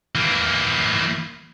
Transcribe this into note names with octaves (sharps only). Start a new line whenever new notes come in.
E3 A#3